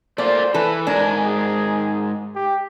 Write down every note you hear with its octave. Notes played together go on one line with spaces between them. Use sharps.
A3 A#3 F4 C5 D5
E3 A4 B4
G#2 D4 A#4 G#5
G#4
G4